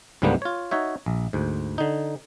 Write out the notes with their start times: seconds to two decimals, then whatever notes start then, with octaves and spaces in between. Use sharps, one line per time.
0.22 C#2 G#2 D3 G3 A#3 B3
0.42 F4 C#5
0.71 D#4 F#4 C#5 E5
1.06 A#1
1.33 D2 G#2
1.78 D3 D#4